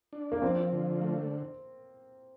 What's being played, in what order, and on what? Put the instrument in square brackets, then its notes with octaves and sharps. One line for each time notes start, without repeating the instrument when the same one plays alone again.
[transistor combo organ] D4
[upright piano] A#3
[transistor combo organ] F3 [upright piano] C4
[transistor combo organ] D3
A3